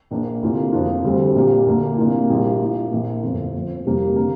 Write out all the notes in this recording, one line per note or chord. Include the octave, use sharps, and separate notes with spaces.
A#1 A#2 A#3 D4
D2 C3 A#3 F4
F1 F2 F3 D4 F4
D2 D3 G3 C4
A#1 A#2 A#3 G4
D2 D3 A#3
C2 A#2 A#3 F4
A#1 A#2 G3 A#3 F4
A#2 A#3 F4
A#1 A#2 A#3
G1 F2 F3
F2 F3 C4
F1 F2 C3 G3 A#3
D3 A#3